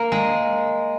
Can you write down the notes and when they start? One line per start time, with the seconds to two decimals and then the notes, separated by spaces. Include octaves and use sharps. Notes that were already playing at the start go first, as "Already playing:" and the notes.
Already playing: A#3
0.12 G#3